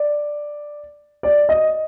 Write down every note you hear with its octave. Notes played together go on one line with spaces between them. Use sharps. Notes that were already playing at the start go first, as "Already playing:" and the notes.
Already playing: D5
D5
D#5